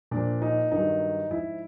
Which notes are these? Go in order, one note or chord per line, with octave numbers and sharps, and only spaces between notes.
A#2 F3 D4
D#4
G2 D#3 F#3 D#4
G#2 F3 E4